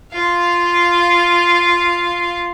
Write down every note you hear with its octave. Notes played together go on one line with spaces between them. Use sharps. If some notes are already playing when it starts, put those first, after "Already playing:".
F4 F5